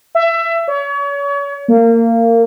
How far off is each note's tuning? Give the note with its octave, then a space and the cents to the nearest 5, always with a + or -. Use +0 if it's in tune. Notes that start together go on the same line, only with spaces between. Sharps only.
E5 +20
C#5 +35
A#3 -25